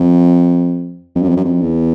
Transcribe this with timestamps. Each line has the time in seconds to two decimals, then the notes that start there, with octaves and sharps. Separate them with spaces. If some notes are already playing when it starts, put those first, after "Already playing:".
Already playing: F2
1.15 F2
1.22 F#2
1.30 F2
1.37 F#2
1.44 F2
1.61 E2